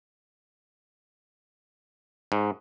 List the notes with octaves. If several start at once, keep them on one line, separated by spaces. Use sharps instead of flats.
G#2